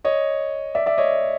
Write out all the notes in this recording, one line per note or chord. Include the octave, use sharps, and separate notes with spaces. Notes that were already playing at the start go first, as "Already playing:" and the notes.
C#5 D#5
D5 E5
D5 E5
C#5 D#5